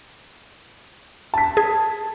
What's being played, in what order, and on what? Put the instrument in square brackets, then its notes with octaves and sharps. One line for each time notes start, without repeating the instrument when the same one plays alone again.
[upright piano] A5 B6
[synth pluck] G#4